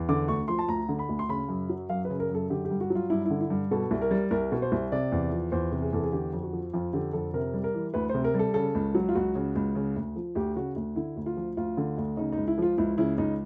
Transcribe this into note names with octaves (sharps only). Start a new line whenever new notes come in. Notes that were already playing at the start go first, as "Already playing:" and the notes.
Already playing: E2
D3 D6
D2 C#6
F3 C6
A5
D2 A#5
D3
B5
D2
C6
C#3 B5
F#2
F#3
F#2 F5
B4
C#3
A#4
F#2 A4
D3 G4
G4
G2
F#4
F#3
F4
G2 E4
D3 E4
E4
G2
B2 A4
C2
A#4
G3
C2 A#4
B2
C5
C2
C3 D5
E2
F3
E2 C5
C3
G#4
E2 A4
G#4
D3 G4
F2
F#4
F3
F2 F4
D3 G4
F2 A4
C3 A#4
G3
A#4
E3
D2 B4
C3 C5
A#4
G3
A4
C#3 A4
C#2
F#3
F4
C#2 F#4
C#3
C#2
C#3
D2
F3
D2 G4
C#3 F#4
D2
D3 E4
D2
F4
F3
D2 F4
D3
D2
C#3 D#4
D#4
C#2
E4
F3 F4
C#2 E4
C#3 E4
C#2 D#4